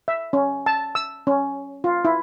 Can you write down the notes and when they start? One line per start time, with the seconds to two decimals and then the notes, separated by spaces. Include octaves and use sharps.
0.08 E5
0.33 C#4
0.66 A5
0.95 E6
1.27 C#4
1.84 F4
2.05 E4